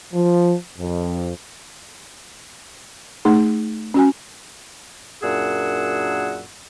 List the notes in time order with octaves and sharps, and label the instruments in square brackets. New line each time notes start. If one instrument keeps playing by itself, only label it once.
[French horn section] F3
F2
[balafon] A3 D#4 G#4
C#4 F#4 G#5
[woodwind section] F#2 A#2 D4 G#4 F#5 E6